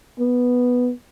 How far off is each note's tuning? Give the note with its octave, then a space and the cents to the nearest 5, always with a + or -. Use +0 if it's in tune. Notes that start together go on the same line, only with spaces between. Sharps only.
B3 -5